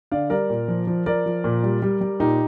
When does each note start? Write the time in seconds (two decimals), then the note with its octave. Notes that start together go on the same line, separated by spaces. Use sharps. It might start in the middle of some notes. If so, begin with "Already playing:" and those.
0.11 D3 D5 F5
0.30 G3 A#4 D5
0.50 A#2
0.68 F3
0.87 F3
1.06 F3 A#4 D5
1.26 F3
1.44 A#2
1.64 G3
1.82 G3
2.01 G3
2.20 A#2 D#4 G4